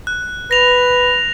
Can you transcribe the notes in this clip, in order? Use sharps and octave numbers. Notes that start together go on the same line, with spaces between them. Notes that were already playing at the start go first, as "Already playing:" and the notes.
F#6
B4 A#6 F7